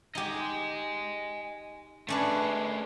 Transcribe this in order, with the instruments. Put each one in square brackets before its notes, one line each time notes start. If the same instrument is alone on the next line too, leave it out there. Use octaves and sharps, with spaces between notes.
[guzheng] D#4 G4 [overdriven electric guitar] D#5 G#5
[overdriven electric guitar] A3 G#4 [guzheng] C#4 D4 B4